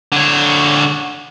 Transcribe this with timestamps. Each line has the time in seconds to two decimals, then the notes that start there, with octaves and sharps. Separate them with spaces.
0.12 D3 C#5